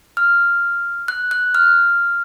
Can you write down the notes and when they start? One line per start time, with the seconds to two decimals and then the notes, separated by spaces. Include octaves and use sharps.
0.17 F6
1.08 F#6
1.31 F#6
1.55 F6